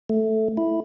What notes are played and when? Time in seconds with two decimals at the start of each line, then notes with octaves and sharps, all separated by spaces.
0.09 A3
0.57 E4